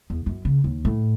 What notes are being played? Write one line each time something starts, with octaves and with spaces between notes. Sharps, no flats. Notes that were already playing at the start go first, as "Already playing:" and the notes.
E2
F#2
C#3
D#2
A2